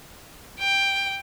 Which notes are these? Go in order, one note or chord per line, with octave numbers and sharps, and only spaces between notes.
G5